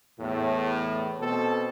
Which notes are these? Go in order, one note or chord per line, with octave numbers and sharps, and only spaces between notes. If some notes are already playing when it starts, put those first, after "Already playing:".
E2 A2
B2 C4 A4